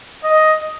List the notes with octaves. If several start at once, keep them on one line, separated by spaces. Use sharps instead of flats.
D#5